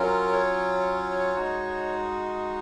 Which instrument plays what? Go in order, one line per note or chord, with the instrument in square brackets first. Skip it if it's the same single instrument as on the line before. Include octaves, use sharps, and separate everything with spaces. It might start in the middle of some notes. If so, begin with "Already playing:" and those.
Already playing: [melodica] F#3 C#4 F4 A#4
C#5
G#3 D#4 F#4